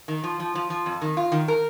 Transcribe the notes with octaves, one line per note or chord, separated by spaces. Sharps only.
D#3
F3
F3
F3
F3
F2
D#3
F4
D#3
A#4